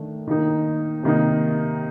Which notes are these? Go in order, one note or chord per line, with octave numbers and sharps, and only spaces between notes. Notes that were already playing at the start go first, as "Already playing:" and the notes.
Already playing: D#3 A3 D4
D#3 A#3 D#4
C3 D#3 A#3 D#4